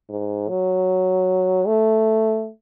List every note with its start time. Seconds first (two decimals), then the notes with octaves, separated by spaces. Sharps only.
0.09 G#2
0.49 F#3
1.67 A3